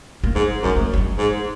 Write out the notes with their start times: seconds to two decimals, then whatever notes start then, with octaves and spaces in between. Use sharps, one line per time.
0.24 A#3
0.35 G#2 G#3
0.63 F#2 G#3
0.76 A#3
0.94 F#3
0.98 G#3
1.18 G#2